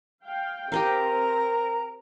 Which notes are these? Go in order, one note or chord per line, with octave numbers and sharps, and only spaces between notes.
F5 G5
C4 G4 A#4 D#5 F5 A#5